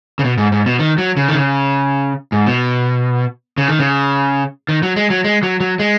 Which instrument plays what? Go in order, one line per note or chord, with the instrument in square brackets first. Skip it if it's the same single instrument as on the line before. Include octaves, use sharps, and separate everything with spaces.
[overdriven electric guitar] C#3
B2
G#2
G#2
B2
D#3
F#3
C#3
D#3
C#3
G#2
B2
C#3
D#3
C#3
D#3
F#3
G#3
F#3
G#3
F#3
F#3
G#3